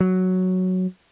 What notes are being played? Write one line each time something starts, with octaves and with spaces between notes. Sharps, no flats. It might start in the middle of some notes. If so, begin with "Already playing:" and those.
F#3